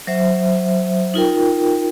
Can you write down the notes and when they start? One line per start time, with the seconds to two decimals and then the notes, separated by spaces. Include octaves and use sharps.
0.07 F#3 C5 E5
1.14 D#4 F4 A#4 G5